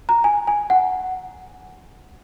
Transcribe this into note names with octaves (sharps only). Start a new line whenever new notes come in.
A#5
G#5
G#5
F#5